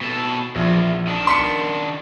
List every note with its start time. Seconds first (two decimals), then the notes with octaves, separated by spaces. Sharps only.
0.01 B2 A4
0.56 A#1 E2
1.08 D#3 D4
1.27 C6 B6 C#7